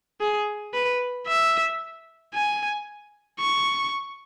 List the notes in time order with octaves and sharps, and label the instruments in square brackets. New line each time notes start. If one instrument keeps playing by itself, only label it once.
[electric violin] G#4
B4
E5
G#5
C#6